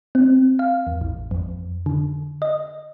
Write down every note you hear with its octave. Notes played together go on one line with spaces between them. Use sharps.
C4
F5
E2
A1
F2
D3
D#5